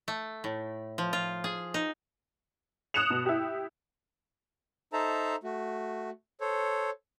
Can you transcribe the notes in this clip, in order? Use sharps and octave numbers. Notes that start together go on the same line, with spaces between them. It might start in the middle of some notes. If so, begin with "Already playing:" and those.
A3
A2
F3
F4
G#4
D#4
D#6 F#6 C#7 E7 F7
B2
E4 G4
D#4 A4 C5 E5 A5 A#5
A3 F#4
A4 C5 C#5